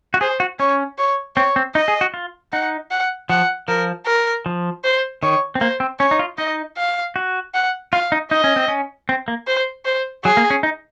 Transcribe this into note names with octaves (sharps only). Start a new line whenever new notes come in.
F#4
G#4 C5
F#4
C#4 C#5
C#5
C4 C#5
C4
D#4 D#5
G#4
F#4
F4
D#4 F#5
F#5
F3 F#5
F3 A#4
A#4
F3
C5
D#3 C#5
C4
A#3 C5
C4
C#4 C#5
D#4
F4
D#4 D#5
F5
F#4
F#5
F4 F5
D#4
D#4 D#5
C#4
C4
C#4
C4
A#3
C5
C5
F#3 G#4
A#3
C#4
D#4